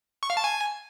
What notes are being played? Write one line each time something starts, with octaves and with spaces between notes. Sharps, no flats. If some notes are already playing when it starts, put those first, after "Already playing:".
C#6
F5
A5
G#5